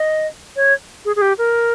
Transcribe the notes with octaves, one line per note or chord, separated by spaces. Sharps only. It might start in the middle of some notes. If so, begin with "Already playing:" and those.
Already playing: D#5
C#5
G#4
G#4
G4
A#4